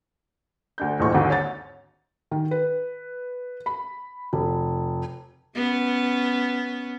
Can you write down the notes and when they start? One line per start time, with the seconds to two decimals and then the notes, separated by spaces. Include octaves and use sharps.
0.78 D2 D4 G6
1.00 D#1 A1 A2 C#6
1.14 G#1 D#2 G#2 D3 F#3
1.30 C#5 A6
2.31 D#3
2.51 B4
3.66 B5
4.33 F1
5.56 B3 C#4